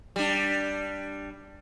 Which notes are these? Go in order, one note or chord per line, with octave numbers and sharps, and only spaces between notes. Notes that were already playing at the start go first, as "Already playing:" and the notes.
G3 D4